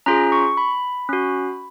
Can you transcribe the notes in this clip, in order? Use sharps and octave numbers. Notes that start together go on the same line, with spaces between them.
C#4 F4 G#4 A#5
C#6
B5
C#4 F#4